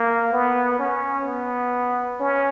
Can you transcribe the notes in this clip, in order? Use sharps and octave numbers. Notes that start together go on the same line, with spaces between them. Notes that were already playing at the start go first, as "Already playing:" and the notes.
Already playing: A#3
B3
C#4
B3
C#4